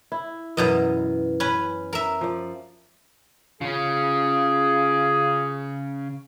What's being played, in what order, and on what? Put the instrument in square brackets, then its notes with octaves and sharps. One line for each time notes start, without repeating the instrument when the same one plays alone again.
[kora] E4
[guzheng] F#2 B2 D#5 [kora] E3 A#4
[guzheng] C#4 B4
A#4 E5
[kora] F3 D5
[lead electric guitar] C#3 C#4 [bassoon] F4 [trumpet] G#4